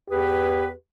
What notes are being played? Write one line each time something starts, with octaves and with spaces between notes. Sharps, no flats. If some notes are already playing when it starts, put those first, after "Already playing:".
E2 G4 G#4 B4